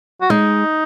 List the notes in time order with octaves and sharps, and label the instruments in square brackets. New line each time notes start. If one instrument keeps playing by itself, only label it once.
[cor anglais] F#4
[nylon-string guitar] G#3 [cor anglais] D#4